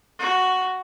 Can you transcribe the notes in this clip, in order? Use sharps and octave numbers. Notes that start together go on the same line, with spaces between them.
F#4